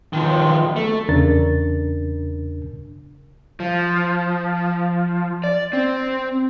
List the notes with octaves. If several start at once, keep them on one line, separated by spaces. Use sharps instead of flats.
D#3 F3
A3
E2 C#3 D4 A#4 A6
F3
D5
C4